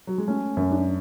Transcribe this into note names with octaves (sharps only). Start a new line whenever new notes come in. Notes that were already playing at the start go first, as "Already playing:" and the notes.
F#3
G#3
A3 C#4
F#2
D4